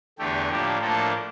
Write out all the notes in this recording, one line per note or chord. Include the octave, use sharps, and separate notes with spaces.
E2 D3 A3 G4
A2 F3 A#3 D4 G4
A2 F3 A#3 D4 A4